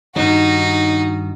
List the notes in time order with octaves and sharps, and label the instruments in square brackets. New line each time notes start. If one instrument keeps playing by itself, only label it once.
[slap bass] G2 D#3 [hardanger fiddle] D#4 F#4